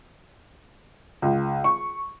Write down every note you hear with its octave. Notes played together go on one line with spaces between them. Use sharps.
C#2
C#6